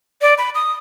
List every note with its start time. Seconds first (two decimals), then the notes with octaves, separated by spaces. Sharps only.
0.22 D5
0.38 B5
0.55 D#6